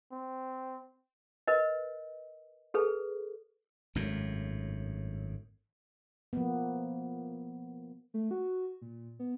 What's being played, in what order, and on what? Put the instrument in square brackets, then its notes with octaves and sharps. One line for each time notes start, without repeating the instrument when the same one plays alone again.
[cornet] C4
[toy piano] A#4 B4 D#5
G#4 A4 B4
[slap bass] G#1 F#2 A2
[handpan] F3 A#3 B3
[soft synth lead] A3
F#4
A#2
B3